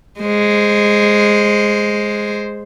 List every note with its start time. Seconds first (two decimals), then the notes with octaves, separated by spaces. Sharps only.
0.20 G#3 C5